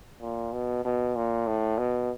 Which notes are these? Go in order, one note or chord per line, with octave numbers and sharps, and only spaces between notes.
A#2
B2
B2
A#2
A2
B2